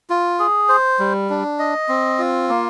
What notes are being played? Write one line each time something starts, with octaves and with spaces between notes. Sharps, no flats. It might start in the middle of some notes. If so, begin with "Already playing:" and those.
F4
G#4
C5
G3
D4
D#5
C4
F4
A#3